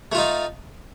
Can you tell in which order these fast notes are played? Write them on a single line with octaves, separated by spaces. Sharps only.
A3 F4 D#4